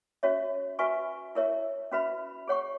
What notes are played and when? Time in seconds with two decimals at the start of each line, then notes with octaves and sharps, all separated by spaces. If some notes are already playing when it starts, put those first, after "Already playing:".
0.23 C#4 F#4 C#5 E5
0.79 F#4 B4 E5 G#5 C#6
1.35 E4 A#4 C#5 E5
1.92 C#4 F#4 B4 E5 B5
2.48 G#4 C#5 F#5 C#6